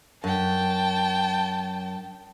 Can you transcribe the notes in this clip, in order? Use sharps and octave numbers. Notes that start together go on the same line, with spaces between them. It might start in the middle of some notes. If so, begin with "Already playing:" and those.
F#2 G5 A5